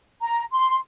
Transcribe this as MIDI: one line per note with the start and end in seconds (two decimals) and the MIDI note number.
0.22 0.41 82
0.52 0.77 84